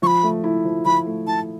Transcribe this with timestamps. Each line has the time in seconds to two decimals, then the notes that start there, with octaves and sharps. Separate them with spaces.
0.02 F3 C#6
0.07 B5
0.23 A3
0.44 E4
0.65 F3
0.85 F3 B5
1.07 A3
1.27 E4 A5